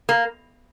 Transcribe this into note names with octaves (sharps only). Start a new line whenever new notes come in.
A#3